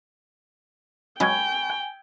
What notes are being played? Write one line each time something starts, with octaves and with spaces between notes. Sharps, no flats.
F#3 G#3 C#4 G5 G#5 B5 C#6 G#6